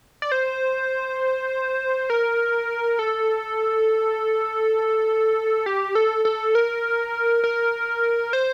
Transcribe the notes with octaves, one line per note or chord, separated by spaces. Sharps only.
D5
C5
A#4
A4
G4
A4
A4
A#4
A#4
C5